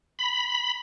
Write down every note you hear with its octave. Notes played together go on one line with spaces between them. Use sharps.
B5